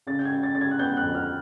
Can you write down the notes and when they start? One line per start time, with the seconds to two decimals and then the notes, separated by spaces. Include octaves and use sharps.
0.07 C#3 A6
0.19 G6
0.25 G#6
0.32 C#3
0.43 A6
0.55 C#3 A6
0.61 G#6
0.71 F#6
0.79 B3 G6
0.97 F#6
1.02 F2
1.15 F6